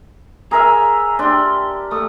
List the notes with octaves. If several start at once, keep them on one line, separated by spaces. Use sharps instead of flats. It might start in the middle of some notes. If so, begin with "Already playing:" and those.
G#4 A#4 E5 A#5
D4 G4 C6
A3 D#6